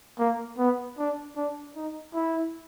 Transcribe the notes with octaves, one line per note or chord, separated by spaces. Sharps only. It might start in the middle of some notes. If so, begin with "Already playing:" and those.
A#3
B3
D4
D4
D#4
E4